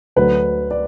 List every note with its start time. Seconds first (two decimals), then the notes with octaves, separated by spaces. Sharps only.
0.16 D2 D3 F#3 B4
0.71 D5